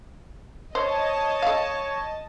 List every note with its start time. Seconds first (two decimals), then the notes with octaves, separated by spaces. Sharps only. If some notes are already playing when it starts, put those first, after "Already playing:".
0.75 C5 C#5 D#5 A5
1.42 A4 F5